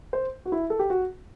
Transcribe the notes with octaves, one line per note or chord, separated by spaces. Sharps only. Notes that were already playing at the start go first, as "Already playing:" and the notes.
C5
F#4
E4
A4
G4
F#4